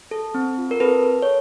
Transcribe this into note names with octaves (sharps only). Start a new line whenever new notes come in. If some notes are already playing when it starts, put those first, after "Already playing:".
A4
C4
F4
A#4
C4 A4 B4
A4
C#5